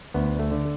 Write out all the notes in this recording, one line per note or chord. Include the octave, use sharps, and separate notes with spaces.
D2 B3
A3
D3